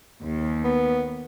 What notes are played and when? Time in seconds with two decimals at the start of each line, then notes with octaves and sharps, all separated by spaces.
0.23 D#2
0.64 B3